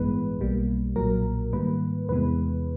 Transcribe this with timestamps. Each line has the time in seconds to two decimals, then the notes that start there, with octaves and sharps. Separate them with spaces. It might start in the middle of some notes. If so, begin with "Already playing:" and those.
Already playing: A1 G2 E3 G#3 B3 B4
0.39 B1 B2 G3 A#3
0.96 B1 A#2 F#3 A#3 A#4
1.53 G#2 D#3 G3 A#3 B4
2.09 E2 C3 E3 G#3 B3 B4